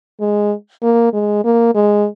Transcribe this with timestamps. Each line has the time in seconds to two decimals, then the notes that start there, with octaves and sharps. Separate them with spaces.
0.20 G#3
0.83 A#3
1.13 G#3
1.45 A#3
1.75 G#3